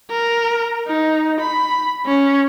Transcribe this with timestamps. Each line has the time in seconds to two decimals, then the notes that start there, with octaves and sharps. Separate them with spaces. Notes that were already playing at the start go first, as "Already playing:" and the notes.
0.11 A#4
0.88 D#4
1.41 B5
2.06 C#4